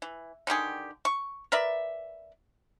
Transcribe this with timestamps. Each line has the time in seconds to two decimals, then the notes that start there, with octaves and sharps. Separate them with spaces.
0.02 E3
0.47 D3 D#3 G4 G#4
1.05 C#6
1.52 A#4 B4 D5 E5